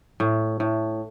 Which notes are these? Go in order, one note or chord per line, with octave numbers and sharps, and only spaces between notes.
A2
A2